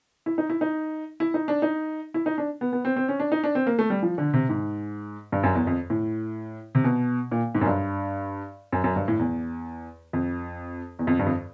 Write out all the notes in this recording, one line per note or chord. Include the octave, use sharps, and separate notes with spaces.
E4
D#4
E4
D#4
E4
D#4
D4
D#4
E4
D#4
D4
B3
B3
C4
C4
C#4
D4
D#4
D4
C4
A#3
A3
G3
F3
D3
C3
G#2
G2
F#2
E2
F2
A2
C3
B2
A#2
G#2
F#2
G2
F#2
F#2
G2
A2
E2
F2
E2
F2
G2
F2